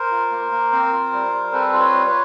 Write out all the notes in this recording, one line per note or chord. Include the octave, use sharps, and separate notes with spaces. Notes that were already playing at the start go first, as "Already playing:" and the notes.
Already playing: A#4 C5
F4
A#3
A#3
C4
F4
G3
G3
C4 A4 B4
F4
B4 C#5
G3
B4 C#5